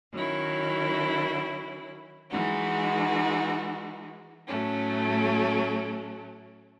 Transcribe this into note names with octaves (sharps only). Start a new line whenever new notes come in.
D#3 F#3 C#4 E4
E3 G#3 D#4 F#4
A2 F#3 A3 C#4